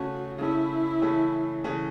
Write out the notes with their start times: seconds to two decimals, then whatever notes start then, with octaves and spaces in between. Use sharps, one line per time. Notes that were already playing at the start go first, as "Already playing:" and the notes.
Already playing: C#3 A3 C#4 F#4
0.38 C#3 A3 C#4 E4
1.02 C#3 E3 A3 C#4
1.64 C#3 E3 A3 C#4